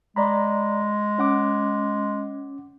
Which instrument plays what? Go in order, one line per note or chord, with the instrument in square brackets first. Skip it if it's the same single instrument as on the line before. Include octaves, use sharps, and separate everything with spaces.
[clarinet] G#3 [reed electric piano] D5 A#5 B5
[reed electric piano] C#4 F#5 D6